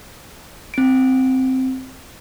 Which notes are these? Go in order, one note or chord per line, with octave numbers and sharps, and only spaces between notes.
C4 D7